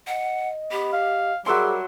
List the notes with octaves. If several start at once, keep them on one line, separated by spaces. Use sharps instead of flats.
D#5 F#5
B3 G4
F5
F#3 G3 G#4 A#4 E5 C6